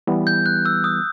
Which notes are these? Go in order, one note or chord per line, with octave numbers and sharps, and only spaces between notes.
E3 G3 B3
G6
F#6
E6
D#6